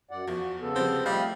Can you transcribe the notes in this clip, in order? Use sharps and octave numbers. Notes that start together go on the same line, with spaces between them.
F#2 D5 F#5
E2 F3 F#4
C#3 B3 A4
C3 F3 G3 C4
F3 G3 A3 D#5 F5 G6